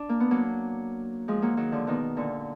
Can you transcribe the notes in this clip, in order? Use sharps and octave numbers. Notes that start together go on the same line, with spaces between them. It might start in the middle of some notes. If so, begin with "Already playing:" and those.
Already playing: D4
A#3
B3
F#3 A#3
F3 G#3
F#3 A#3
D#3 F#3
D3 F3
B2 D#3
A#2 D3